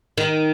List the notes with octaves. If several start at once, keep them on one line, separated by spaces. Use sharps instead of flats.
D#3